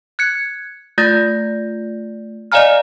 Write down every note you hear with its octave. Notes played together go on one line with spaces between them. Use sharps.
F#6 G#6 C#7
A3 F4 D5 G6 A6 A#6
D5 D#5 F5 G#5 A#5 F6